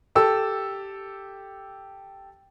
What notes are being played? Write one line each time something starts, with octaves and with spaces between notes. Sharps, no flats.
G4 A4 E6